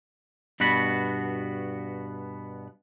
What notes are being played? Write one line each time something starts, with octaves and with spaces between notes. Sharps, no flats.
G2 B2 B3 F#4 B5